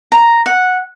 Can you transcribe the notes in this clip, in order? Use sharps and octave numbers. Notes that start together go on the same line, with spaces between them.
A#5
F#5